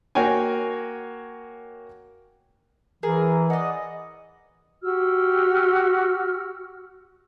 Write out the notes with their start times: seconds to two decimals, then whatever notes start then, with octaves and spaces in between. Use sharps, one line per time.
0.15 A#3 F#4 C#5 G5 G#5
3.03 E3 G#4 A#4
3.50 D5 D#5 F#5
4.83 F#4 G4 E6 F6